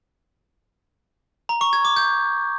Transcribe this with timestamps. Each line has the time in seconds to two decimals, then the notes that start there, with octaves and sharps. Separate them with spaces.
1.49 A#5
1.61 C#6
1.73 G#6
1.85 D6
1.96 G6